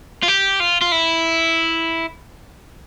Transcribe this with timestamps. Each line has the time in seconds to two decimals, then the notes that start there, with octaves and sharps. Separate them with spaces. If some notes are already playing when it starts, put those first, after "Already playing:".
0.23 F4
0.28 G4
0.60 F4
0.81 F4
0.92 E4